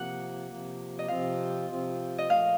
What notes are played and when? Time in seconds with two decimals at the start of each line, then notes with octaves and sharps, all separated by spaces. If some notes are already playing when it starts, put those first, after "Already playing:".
Already playing: C3 F3 A#3 F#5
0.48 C3 F3 A#3
0.99 D#5
1.08 C3 F3 C4 F4 F5
1.69 C3 F3 C4 F4
2.18 D#5
2.29 A#2 F3 A3 F5